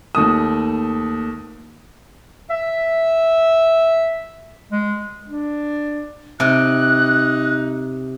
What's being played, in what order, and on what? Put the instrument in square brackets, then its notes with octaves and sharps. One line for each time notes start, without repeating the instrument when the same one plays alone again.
[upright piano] D#2 A3 D#6
[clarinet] E5
G#3
[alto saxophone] D4
[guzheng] C3 [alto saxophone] D#4 [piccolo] F#6